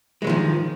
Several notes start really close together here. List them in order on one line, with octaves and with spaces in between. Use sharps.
G#3 F#3 F3 D#3